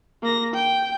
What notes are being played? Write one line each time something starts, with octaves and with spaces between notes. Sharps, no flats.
A#3 A#6
G5